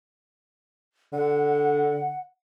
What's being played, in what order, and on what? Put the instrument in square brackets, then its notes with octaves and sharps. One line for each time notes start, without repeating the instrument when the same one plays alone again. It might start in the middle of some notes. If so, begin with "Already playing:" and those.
[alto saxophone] D3 [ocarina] F#5